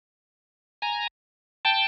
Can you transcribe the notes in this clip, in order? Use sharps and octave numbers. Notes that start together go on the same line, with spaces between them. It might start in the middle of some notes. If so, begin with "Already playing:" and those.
G#5 A#5
G5 A5